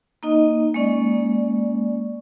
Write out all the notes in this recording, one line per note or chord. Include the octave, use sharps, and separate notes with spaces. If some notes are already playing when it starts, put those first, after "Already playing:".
A#3 D#4 D#5
G#3 A#3 C#4 D5